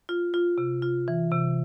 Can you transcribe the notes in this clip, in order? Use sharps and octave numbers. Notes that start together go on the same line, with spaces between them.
F4
F4
C3
F4
E3
C3